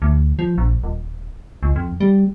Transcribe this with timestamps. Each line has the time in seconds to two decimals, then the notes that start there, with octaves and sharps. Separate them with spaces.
0.02 D2
0.39 F3
0.58 A#1
0.84 D#1
1.63 C#2
1.76 F2
2.00 G3